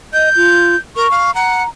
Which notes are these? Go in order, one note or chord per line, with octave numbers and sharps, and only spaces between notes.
D#5 G6
F4
A#4 C#6
F5
F#5 A#5